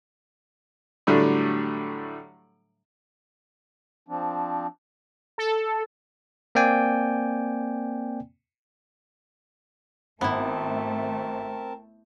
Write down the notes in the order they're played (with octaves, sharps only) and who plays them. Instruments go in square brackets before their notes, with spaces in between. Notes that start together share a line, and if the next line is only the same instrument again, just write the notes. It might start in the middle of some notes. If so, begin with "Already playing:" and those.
[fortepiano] A2 D3 F#3 G3 A3 D4
[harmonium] F3 C4 D4
[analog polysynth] A4
[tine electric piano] A#3 C4 D5 G5 G#5
[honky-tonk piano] G#1 [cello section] A3 [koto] B3 E4 [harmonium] C4 A#4 A5